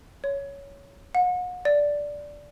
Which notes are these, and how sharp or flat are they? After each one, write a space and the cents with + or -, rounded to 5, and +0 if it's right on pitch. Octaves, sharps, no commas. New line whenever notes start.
C#5 +10
F#5 -40
D5 -5